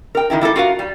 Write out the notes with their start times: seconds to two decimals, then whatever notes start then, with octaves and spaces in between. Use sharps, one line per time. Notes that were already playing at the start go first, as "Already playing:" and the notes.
0.15 A#4 G5
0.30 D#3 F3 E4 A#4
0.41 G3 E4 F#4 A4
0.56 F4 F#4 A#4 F5
0.79 G3